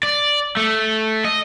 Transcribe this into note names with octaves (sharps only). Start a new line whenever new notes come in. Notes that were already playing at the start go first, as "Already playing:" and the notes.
D5
A3
D#5